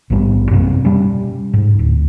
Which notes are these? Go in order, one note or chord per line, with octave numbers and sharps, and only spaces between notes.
A#1 G#2 G3 B3
F#2 C3 A#3 C4
B2 G3 C#4
G#2
D1